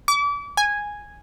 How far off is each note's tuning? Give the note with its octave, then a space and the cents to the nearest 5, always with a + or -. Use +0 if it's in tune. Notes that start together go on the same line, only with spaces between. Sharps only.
D6 -35
G#5 -5